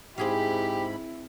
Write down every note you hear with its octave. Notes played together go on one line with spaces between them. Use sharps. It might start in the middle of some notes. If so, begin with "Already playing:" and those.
G#2 C4 E4 G4 G#4 F5 B5